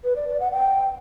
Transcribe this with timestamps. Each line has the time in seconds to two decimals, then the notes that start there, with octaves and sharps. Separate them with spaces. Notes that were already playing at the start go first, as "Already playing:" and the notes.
0.04 B4
0.16 D5
0.28 D5
0.40 F#5
0.52 G5